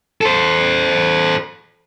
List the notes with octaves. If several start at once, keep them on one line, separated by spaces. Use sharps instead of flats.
A4 C5